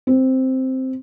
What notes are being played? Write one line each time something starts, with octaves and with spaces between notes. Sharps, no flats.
C4